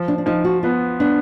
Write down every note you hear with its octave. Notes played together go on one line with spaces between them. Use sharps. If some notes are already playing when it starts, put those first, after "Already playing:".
Already playing: F3
D4
D4
F3 D#4
F#4
B3 F4
B3 D4